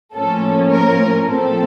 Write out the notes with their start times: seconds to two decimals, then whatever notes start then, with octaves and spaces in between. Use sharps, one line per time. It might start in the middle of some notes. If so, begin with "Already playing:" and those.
0.14 A2 F3 A#3 C#4 A4
0.71 A#4
1.28 A#2 F3 C4 A4